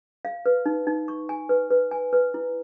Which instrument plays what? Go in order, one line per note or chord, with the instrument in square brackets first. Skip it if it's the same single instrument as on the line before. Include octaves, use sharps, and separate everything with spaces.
[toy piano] F5
B4
D#4
D#4
C#6
G#5
B4
B4
G#5
B4
E4